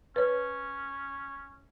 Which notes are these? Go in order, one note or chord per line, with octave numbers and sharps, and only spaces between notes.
C#4 B4 C#5